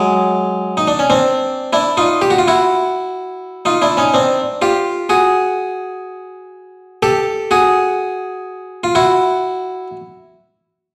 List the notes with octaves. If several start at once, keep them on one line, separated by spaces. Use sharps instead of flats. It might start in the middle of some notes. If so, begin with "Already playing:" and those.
Already playing: F#3 G#3
D#4
D4
C#4
C4 D4
D4 E4
D#4 F4
G4
F#4
F4
E4 F#4
D#4 F4
D4 E4
C#4 D#4
C4 D4
F4 G4
F#4 G#4
G4 A4
F#4 G#4
F4
E4 F#4